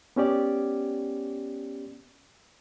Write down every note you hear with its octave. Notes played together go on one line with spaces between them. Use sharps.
B3 C#4 G4 D5